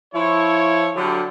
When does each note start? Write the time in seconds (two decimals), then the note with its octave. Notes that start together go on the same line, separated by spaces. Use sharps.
0.14 F3 E4 C#5
0.95 D3 F#3 G3